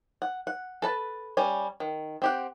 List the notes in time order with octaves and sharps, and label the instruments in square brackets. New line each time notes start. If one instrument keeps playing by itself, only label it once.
[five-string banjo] F#5
F#5
A4 B4 A5
G3 C#4 G#5
D#3
C4 G4 F#5